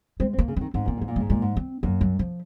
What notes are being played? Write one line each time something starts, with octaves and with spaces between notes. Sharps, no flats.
G#3 C4
C4
A#3
C#3
D#3 C4
G#2 C4
A#2 C4
G#2 A#3
A#2
G#2 G#3
A#2 G#3
G#2
C4
F#2 A#3
F#3
F3